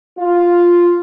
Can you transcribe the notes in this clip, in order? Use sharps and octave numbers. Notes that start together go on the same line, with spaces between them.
F4